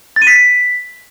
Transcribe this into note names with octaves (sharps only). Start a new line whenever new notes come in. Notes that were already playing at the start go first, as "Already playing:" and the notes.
A6
D#7
B6